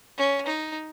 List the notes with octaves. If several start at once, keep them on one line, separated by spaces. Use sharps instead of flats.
C#4
D#4